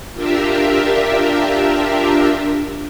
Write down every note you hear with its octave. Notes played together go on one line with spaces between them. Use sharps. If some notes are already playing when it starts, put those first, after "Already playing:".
D4 F4 G4 A#4 E5